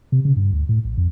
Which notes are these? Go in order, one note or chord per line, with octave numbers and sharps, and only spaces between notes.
C3
C#3
G2
D2
A2
A#1
F2